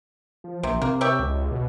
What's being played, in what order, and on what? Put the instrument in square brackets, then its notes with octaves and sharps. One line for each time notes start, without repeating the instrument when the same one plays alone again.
[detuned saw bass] F3
[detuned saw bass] A#1 [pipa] C3
[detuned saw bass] C3 [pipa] A#3
[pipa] G4 C#5 E5
[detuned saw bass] C#2
B2